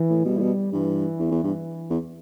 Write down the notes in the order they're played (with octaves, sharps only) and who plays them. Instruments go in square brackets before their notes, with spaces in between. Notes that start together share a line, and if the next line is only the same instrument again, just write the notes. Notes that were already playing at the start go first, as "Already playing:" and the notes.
Already playing: [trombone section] E3
[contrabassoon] A2
[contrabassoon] B2 [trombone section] G3
[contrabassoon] A2
B2
[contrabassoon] G2 [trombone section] E3
[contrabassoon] E2
E2
G2
E2